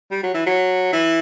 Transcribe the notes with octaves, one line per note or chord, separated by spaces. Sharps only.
G3
F#3
E3
F#3
E3